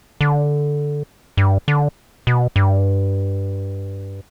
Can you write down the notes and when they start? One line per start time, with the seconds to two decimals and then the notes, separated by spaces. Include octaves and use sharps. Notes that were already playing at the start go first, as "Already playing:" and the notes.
0.21 D3
1.37 G2
1.68 D3
2.27 B2
2.56 G2